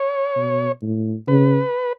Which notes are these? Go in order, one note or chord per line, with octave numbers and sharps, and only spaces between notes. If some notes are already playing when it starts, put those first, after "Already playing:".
Already playing: C#5
B2
A2
C#3 B4